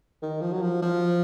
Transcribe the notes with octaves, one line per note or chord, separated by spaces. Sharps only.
D#3
F3
F#3
F3
F3